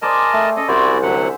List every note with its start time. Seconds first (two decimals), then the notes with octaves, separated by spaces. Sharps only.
0.02 G#4 A#4 C5 D5 D#5 A5
0.34 A3
0.56 C#4 A4 D#5
0.68 C2 E4 F#4 C5 D5
1.02 D2 D3 F#3 E5 F#5